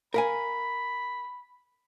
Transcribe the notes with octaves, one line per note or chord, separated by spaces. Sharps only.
A#4 F5 G#5 B5